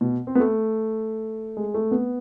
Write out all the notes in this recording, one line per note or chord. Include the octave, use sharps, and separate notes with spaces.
B2
C4
B3
A3
G#3
A3
B3